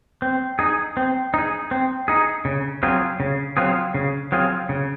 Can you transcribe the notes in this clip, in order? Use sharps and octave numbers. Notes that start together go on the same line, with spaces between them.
C4
D#4 G#4
C4
D#4 G#4
C4
D#4 G#4
C#3
F#3 C4 F4 G#4
C#3
F#3 C4 F4 G#4
C#3
F#3 C4 F4 G#4
C#3